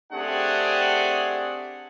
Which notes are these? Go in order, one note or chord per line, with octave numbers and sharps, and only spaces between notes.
A3 C4 D4 G4 G#4 F#5